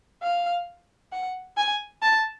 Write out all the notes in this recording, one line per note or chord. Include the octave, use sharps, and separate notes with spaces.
F5
F#5
G#5
A5